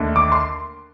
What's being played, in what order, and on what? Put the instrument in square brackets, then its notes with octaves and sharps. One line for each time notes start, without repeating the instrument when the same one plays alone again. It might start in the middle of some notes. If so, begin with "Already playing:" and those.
Already playing: [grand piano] D#2 D3 A3 D4
D6
C6